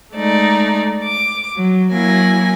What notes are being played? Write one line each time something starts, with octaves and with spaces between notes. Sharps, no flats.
G#3 A3 D#4 D5
D6
F#3
F#3 A#3 E4 G#5 A#6